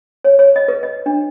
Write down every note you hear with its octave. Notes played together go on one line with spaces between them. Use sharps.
C#5
C#5
D#5
B4
D#5
D4